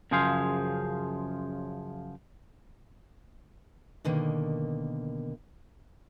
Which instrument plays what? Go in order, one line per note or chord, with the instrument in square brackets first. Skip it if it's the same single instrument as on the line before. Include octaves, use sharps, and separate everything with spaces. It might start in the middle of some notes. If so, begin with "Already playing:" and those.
[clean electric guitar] F#2 C#3 F3 G#4 C5 F5
[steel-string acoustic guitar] B2 D3 D#3 A#3